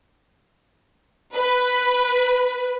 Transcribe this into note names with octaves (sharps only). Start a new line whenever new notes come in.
B4